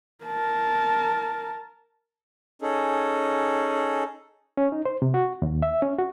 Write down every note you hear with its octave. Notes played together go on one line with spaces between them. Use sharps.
A#4 A5
C#4 D#4 G#4 A4
C#4
D#4
C5
C3
F#4
D#2
E5
C#4
F#4